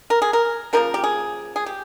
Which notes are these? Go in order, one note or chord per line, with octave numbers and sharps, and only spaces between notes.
A#4
G#4
A#4
C#3 F3 A#3 A#4
G4
G#4
G#4
G4